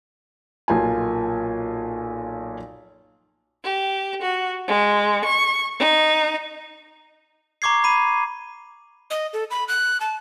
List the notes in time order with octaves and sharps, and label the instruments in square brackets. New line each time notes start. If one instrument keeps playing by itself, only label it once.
[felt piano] B1 A#2 F4 G#5
[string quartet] G4
F#4
G#3
C#6
D#4
[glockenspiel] A#5 C#6 D6 G#6 C7
B5 D#7
[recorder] D#5
A4
B5
F#6
A5